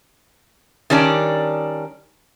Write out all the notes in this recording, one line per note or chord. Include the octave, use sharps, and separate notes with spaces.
D#3 G3 C#4 D4